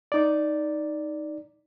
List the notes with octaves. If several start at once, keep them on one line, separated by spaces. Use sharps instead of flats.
D#4 D5